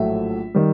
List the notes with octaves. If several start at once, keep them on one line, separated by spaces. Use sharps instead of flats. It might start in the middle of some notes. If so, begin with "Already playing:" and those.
Already playing: A#1 A2 F#3 A3 E5
D#3 G3